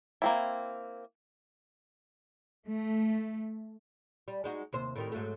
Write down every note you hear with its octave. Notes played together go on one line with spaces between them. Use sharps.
A#3 C4 E4
A3
G3
G#3 D#4 F#4
D#2 C3 C5
A2 D#3 G3
G#2 F#3 A3